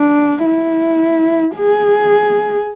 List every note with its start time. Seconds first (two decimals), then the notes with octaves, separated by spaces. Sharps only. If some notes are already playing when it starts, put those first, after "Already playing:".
Already playing: D4
0.45 E4
1.56 G#4